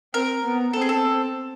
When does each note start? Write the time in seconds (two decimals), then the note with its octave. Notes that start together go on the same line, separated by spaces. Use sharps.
0.14 C4 A#4
0.44 B3
0.73 C4 A4
0.82 G#4
0.89 A4